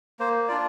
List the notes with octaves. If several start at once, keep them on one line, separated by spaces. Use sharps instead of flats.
A#3 C5
D4 F4 D5